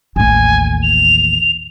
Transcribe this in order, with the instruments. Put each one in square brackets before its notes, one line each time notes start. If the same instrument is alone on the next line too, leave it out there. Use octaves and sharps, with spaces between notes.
[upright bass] A1 D#2 [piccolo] G#5
[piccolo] F7